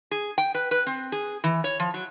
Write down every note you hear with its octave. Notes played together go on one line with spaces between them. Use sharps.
G#4
G5
B4
B4
C4
G#4
E3
C#5
F3
F#3